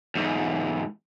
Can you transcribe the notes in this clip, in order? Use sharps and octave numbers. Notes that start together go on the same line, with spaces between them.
E2 G#2